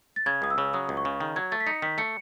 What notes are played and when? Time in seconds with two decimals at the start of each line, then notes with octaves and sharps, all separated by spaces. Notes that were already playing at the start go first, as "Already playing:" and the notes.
0.16 A6
0.26 C#3 G#6
0.42 C#2 D#6
0.50 E6
0.58 C#3
0.73 F#3 D#6
0.89 C#2
0.97 C#6
1.05 C#3
1.20 D#3
1.36 F#3 G#6
1.52 A3 A6
1.60 B6
1.67 D#4 C#7
1.82 D#3 B6
1.98 A3 C#7